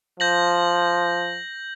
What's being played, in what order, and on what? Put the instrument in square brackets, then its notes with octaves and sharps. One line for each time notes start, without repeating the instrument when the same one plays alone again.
[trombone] F3 [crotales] G6 A#6 F#7